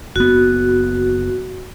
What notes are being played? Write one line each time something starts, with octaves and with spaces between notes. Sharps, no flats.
F#1 B3 F#4